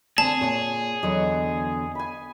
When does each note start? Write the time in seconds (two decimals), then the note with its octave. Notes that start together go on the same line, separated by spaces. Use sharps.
0.18 D3 C4 G#4 D5 A5
0.41 A#2 C#5 G#5
1.03 E2 D3 F#3 C#5 D#5
1.95 G#5 B5